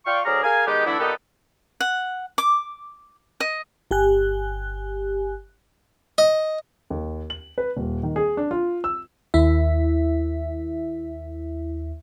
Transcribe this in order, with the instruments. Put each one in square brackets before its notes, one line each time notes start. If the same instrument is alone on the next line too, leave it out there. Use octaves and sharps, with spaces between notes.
[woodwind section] F4 D5 F5 G5 C#6
D2 F#3 G#4 D5 A#5 F6
G#4 A#4 F5 G#5
D#3 G#3 B3 D#4 G4
D3 E3 A3 D4 E4
A#2 D#3 B3 D#4 G4 A4
[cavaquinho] F#5
D6
D#5
[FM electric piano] G1 G4 G#5 F#6
[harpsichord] D#5
[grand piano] D#2
F#7
B4
D#1
D#3
G#4
D4
F4
E6
[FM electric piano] D#2 E4 E5